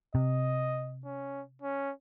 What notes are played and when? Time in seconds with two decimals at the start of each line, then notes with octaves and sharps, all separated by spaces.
0.15 C3 D#5
1.05 C#4
1.62 C#4